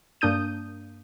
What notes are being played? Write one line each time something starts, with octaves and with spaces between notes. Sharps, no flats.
G2 A#3 D4 D#6 G6 D#7